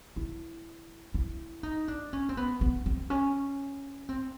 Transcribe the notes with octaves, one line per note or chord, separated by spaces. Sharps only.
E4
E4
D#4
D4
C#4
C4
B3
B3
C4
C#4
C4